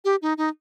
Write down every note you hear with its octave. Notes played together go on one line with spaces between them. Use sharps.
G4
D#4
D#4